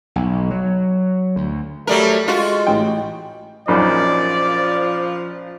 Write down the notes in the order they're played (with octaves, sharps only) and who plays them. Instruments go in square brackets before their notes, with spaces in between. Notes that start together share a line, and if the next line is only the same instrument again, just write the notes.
[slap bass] B1
F#3
D2
[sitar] F#3 G3 A#4 [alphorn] A3
[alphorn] G#3 [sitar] F4 F#4
[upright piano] A1 G5
[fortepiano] A#1 F#2 D#4 [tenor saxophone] F3 [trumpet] D5